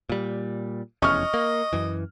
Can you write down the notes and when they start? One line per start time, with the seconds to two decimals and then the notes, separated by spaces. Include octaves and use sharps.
0.09 A#2 G3
1.02 F1 E2 C#4 D#5 C#6 F6
1.34 A#3
1.73 F#2 E3